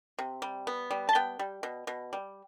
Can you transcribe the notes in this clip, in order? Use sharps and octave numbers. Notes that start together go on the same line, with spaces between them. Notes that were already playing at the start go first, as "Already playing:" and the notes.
C3
G3
B3
G3
A5
B3 G5
G3
B2
B2
G3